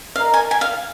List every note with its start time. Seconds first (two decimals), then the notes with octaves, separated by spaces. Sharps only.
0.16 A#4 D#5 F5 A#5
0.34 G#5
0.51 G#5
0.61 F5